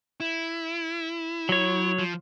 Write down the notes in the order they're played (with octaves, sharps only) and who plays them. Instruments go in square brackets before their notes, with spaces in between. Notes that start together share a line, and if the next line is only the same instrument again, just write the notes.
[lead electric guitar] E4
[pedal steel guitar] F#3 C#5
[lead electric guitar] F3